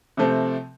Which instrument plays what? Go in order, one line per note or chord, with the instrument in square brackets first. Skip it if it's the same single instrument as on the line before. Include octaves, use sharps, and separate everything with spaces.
[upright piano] C3 F3 A3 C4